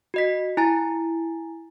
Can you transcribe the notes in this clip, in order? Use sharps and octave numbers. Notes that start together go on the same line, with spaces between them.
F#4 D#5 B6
E4 G#5 A#5 A6